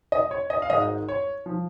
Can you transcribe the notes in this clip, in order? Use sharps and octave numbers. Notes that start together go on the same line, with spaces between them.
D#5
C#5
D#5
F5
G#1 G#2 D#3 G#3 D#4 D#5
C#5
F3